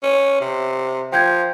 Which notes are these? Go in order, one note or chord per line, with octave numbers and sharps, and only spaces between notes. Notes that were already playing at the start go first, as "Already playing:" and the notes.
C#4
C3
F3 G5 G6 G#6